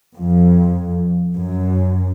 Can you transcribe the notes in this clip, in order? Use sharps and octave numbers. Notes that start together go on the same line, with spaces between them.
F2
F#2